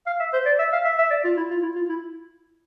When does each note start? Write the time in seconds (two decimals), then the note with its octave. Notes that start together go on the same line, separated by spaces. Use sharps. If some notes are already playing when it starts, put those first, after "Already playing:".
0.07 F5
0.20 E5
0.33 C5
0.46 D5
0.59 E5
0.72 F5
0.85 E5
0.98 E5
1.10 D5
1.24 F4
1.37 E4
1.50 F4
1.62 E4
1.75 F4
1.89 E4